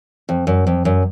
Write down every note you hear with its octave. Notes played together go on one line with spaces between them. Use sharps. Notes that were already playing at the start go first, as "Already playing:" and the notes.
F2
F#2
F2
F#2